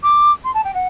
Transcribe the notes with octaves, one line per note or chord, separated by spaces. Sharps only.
D6
C6
A5
G5
F#5